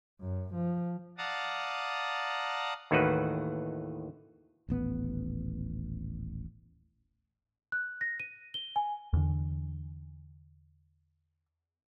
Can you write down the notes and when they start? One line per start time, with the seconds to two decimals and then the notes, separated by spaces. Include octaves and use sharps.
0.21 F#2
0.54 F3
1.18 D5 F5 F#5 A5 A#5 D#6
2.91 D#2 A2 D#3 E3 F#4 B4
4.69 D#1 A1 B3
7.72 F#6
8.01 A#6
8.20 D#7
8.54 G7
8.76 G#5
9.13 E2 D3